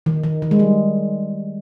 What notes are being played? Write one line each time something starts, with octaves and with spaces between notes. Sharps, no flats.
D#3
D#3
D#3
G#3
G3